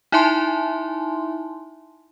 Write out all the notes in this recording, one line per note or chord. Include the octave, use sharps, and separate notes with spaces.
D#4 E4 E5 G#5 A5 C6